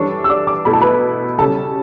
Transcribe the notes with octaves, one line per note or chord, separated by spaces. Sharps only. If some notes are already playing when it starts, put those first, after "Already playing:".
Already playing: E3 G3 D4 A4 C#5 C#6
E6
D5 D6
D5 D6
B2 A3 E4 A4 B5
A5
B4 B5
C#3 G3 C#4 A4 A5